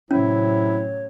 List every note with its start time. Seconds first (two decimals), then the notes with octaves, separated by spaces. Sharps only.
0.11 A2 C3 F#3 C#4 E4 C#5